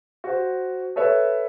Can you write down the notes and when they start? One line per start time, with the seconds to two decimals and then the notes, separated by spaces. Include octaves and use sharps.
0.24 F#4 C5
0.96 A4 B4 C#5 E5